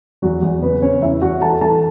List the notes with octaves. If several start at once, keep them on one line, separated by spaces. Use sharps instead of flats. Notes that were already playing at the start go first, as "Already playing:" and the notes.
E2 F#3 F#4
E2
C#3 B3 B4
C#3 C#4 C#5
E2 E4 E5
E2 F#4 F#5
E3 A4 A5
E3 A4 A5